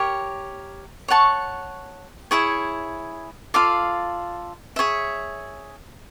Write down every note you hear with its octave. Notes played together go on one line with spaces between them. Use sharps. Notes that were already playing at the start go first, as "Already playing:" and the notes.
Already playing: G4 A#4 C#5
C#5 F#5 A5 C#6
E4 G#4 C#5
F4 A4 D5 F5
G#4 C#5 E5